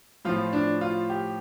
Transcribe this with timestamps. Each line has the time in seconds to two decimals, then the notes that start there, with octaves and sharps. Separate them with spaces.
0.25 A2 F3 F4
0.53 D4
0.81 F4
1.10 G4